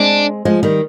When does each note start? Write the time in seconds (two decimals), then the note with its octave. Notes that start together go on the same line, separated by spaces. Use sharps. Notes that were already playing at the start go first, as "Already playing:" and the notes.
Already playing: G#3 C4 D4
0.45 F3 G#3
0.63 D#3 G3